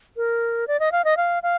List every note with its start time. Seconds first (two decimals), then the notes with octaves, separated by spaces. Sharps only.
0.17 A#4
0.68 D5
0.80 D#5
0.92 F5
1.05 D#5
1.17 F5
1.43 F5